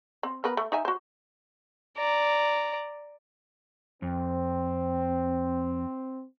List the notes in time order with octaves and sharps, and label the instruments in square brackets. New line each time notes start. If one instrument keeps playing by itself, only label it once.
[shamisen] C4
B3 A#4 B4
A3
D#4 E5 G#5
F#4 C5
[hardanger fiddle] D5 A#5
[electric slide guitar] F2 [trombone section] C4